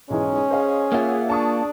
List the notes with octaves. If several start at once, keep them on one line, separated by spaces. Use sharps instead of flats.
B1 G#2 E3 G#3 C#4
G#4 C5 D#5 F5
A#3 F4 C#5 E5 F#5
D4 A5 C#6 D#6